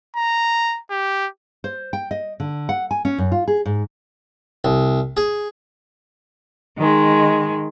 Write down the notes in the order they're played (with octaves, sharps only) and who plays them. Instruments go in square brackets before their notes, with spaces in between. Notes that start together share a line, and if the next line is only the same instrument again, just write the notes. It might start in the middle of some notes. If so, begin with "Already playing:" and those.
[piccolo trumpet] A#5
G4
[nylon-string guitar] C5
G5
D#5
D3
F#5
G#5
C#4
F#2
F4
G#4
G#2
[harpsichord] C2
G#4
[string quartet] D#3 G#3